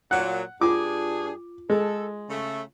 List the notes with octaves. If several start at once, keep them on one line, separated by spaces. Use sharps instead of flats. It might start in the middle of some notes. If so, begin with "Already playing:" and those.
A#2 F#3 F#5
G2 D4 F4 G#4 D6
G#3 A4
C#3 A3